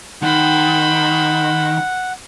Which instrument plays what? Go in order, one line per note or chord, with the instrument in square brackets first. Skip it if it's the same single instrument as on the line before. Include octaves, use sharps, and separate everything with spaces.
[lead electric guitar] D#3 [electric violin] C5 B5 [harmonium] F#5